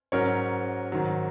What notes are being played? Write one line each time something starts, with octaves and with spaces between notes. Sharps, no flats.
G#2 F#3 C#4 A#4 C#5
G#2 D#3 F#3